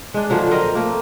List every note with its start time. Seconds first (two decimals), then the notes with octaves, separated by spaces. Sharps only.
0.14 G#3 D4
0.30 A#2 D3 F3 F#3
0.51 C4 A#4 D#5
0.75 A3 A#3